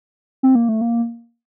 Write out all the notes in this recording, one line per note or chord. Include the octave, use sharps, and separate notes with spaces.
C4
A#3
A3
A#3